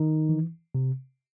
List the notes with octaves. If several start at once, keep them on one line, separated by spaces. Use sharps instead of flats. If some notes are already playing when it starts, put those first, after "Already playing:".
Already playing: D#3 D#4
E3
C3